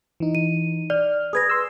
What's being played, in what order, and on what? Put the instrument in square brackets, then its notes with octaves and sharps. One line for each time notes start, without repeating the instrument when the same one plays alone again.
[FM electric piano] E3 D#4
[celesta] D#7
[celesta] D5 [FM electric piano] F6
[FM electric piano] G#4 B4 [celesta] D#6 G#6 A#6
[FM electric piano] C6 E6